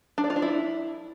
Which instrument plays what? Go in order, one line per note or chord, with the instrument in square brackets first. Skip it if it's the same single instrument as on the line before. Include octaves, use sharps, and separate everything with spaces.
[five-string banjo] D4
D5
F4
D4
E4